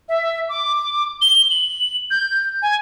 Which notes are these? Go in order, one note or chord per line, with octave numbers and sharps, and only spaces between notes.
E5
D6
G7
F#7
G6
G#5